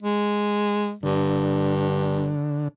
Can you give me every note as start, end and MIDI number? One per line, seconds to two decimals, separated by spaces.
0.03 0.93 56
1.03 2.32 43
1.03 2.68 50